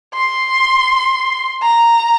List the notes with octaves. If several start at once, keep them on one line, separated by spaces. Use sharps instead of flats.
C6
A#5